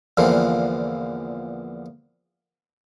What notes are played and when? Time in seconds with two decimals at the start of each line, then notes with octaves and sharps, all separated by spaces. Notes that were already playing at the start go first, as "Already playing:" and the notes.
0.17 E2 A#2 D3 E3 F3